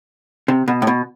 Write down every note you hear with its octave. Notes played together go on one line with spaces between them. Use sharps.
C3
B2
A2
B2